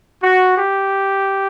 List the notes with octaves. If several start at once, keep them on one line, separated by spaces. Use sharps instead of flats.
F#4
G4